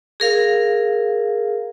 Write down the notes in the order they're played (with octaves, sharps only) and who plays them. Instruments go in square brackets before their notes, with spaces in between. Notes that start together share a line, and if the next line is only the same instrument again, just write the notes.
[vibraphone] G#4 A#4 F5